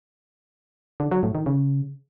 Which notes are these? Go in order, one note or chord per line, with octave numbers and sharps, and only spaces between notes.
D3
F#3
A2
D#3
C#3